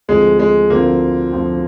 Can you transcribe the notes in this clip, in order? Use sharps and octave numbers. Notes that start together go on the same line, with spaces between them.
D2 D3 F3 G#3 C4
G#3
D2 D3 F3 A#3 C4
D2 D3 F3 C4